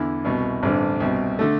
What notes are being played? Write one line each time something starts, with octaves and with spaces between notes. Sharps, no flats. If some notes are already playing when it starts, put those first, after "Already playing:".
Already playing: E2 D3 E4
C2 B2
A1 G2 D3 C4
C2 B2
D3 A3